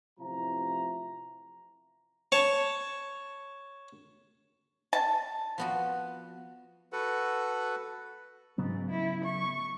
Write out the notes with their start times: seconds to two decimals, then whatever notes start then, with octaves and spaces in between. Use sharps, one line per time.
0.20 A1 C3 F3 E4 A#5
2.32 C#5 A5
4.93 A5
5.58 F3 B3 F#4
6.92 F#4 A4 B4 F#5
8.58 G#2 C#3 F#3 B3
8.91 E4
9.25 C#6